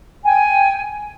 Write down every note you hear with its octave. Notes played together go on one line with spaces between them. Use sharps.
G5 G#5